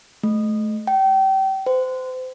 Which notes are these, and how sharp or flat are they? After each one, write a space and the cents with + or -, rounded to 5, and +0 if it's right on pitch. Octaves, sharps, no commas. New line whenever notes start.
A3 -30
G5 -30
C5 -30